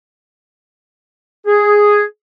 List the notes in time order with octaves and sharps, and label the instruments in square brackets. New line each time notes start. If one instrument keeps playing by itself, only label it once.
[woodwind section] G#4